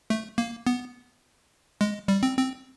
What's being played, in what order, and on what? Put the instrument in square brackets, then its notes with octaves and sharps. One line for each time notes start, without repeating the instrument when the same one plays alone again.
[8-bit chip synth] A3
A#3
B3
G#3
G3
C4
C4